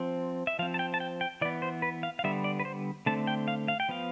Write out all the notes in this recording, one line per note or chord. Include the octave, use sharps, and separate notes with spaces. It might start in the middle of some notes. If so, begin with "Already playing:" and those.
Already playing: F3 C4
E5
F3 C4 F5
A5
G5
A5
G5
G5
E3 B3 D5
C5
B4
F5
F5
D3 G3 B3 E5
D5
B4
C5
D3 A3 C4 A5
G5
F5
F5
G5
F3 B3 F5